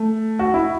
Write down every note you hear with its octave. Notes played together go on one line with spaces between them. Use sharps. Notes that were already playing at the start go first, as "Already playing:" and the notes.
Already playing: A3
F#4
E4